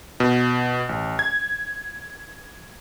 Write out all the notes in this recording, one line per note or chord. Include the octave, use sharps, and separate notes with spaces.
B2
A1
G#6